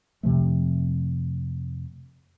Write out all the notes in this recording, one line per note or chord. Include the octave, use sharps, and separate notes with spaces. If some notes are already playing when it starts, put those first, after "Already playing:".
F2 C3 F3 A3